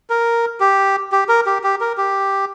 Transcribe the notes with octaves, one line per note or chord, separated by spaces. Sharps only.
A#4
G4
G4
A#4
G4
G4
A#4
G4